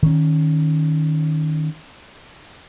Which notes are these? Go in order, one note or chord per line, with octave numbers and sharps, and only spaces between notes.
D#3 C#4